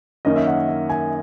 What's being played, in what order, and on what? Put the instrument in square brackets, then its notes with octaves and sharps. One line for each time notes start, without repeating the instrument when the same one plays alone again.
[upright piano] F#2 D#3 A#3 C#4 D#5
E5
F#5
E5
G#5